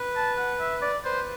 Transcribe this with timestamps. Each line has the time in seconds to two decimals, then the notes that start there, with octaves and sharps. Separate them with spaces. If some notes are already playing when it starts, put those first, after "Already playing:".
Already playing: B4
0.16 A5
0.38 F#5
0.60 E5
0.82 D5
1.05 B4 C5